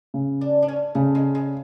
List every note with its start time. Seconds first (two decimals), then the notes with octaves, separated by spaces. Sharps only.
0.14 C#3
0.41 D4
0.63 D4
0.68 C#4
0.95 C#3 A3
1.15 G#3
1.35 G#3